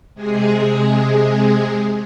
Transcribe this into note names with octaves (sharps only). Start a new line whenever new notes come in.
C3 G#3 G#4